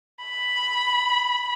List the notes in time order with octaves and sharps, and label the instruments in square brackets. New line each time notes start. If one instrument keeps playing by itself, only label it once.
[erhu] B5